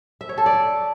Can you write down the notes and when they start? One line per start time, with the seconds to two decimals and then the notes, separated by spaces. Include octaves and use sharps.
0.21 E5
0.29 C#5
0.38 A4
0.46 D5